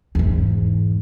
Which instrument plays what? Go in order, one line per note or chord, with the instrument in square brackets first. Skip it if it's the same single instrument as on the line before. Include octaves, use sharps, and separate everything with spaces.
[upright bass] E2 G#2